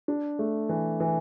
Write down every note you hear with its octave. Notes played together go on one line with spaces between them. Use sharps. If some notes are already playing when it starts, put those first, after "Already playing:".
D4
A3
E3
E3